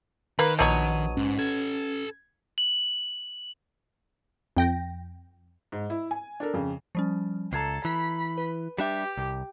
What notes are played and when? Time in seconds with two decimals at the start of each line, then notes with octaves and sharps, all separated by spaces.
0.39 D#3 A#3 B4
0.59 A#1 B2 F#3 C#5 D#6 D#7
1.17 G#2 C#4
1.39 A4 B4 G#6
2.58 F#7
4.57 F2 G5 A#6
5.72 G#2
5.90 E4
6.11 G#5
6.40 D4 A4 A#4
6.54 F2 C#3
6.95 F3 G3 C#4
7.53 C#2 A4 A#5 G#6 C7
7.85 E3 B5
8.38 B4
8.78 G3 D4 G4 E5
9.17 C2